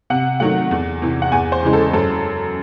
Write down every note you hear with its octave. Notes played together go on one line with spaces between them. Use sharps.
C3 F#5
D#3 F#3 A3 F#5
E2
C3 E3
F#5
E2 G#5
C5
C#3 E3 G#3
A4
F#2 A4